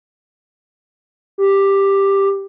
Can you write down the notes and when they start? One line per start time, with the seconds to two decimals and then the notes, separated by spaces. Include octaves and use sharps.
1.38 G4